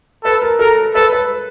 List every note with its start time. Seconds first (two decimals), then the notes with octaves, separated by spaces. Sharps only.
0.24 A4 B4
0.42 A#4
0.59 A4 A#4
0.95 A4 B4
1.13 B4